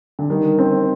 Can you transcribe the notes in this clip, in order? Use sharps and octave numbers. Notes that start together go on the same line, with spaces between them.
D3
D#3 G3
C4